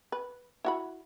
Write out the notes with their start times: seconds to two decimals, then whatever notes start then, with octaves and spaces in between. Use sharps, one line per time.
0.12 B4
0.65 E4 F#4 B5